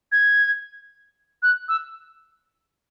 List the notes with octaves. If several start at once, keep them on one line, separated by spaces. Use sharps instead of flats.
G#6
F#6
E6